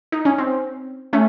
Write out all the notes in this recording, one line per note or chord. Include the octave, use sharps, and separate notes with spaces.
D#4
C#4
C4
A3 C#4